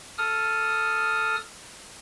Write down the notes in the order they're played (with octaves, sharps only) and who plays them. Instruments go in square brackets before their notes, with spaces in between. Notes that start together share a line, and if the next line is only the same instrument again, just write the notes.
[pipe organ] A4 D#6 F6